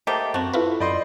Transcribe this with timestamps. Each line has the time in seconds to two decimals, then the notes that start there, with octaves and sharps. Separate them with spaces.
0.07 A3 A#3 G4 C5 D#5
0.34 F#2 C4 F#4 A5
0.54 E4 F4 A4 B4 C5
0.80 F#2 D5 D#5 B5 C6 G6